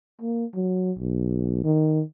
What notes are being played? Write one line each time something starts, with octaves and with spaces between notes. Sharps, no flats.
A#3
F#3
B1
D#3